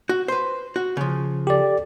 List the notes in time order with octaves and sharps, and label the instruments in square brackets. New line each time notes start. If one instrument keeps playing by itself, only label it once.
[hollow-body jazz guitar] F#4
B4 C5
F#4
C#3 F3
[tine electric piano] G4 A4 D5